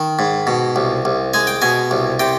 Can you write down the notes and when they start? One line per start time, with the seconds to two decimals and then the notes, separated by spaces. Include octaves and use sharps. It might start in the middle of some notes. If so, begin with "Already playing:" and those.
Already playing: D#3
0.19 G#2
0.47 B2
0.76 C2
1.05 C2
1.34 G#3 G#5
1.47 G5
1.62 B2 G#5
1.91 C2
2.20 C3 G5